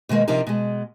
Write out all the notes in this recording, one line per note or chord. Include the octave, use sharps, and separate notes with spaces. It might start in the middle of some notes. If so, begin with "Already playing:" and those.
B2 D#3 G#3 A#3
C3 F3 C4 D4 D#4 A#4
B2 G#3